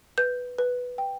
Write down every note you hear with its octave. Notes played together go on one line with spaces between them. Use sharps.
B4 G6
B4
G5